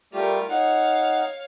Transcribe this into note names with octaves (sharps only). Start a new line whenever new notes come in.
G3 A3 F4 G4 A#4
D#4 C#5 F5 F#5